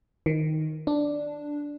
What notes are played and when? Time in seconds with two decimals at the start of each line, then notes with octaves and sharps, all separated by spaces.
0.26 D#3
0.87 D4